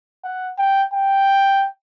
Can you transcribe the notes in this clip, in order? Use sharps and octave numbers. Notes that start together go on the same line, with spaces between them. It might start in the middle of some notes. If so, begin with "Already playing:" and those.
F#5
G5
G5